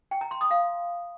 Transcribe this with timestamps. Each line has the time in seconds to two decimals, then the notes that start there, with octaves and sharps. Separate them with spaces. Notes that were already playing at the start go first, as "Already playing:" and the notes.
0.11 G5
0.21 A#5
0.31 C6
0.41 D#6
0.51 F5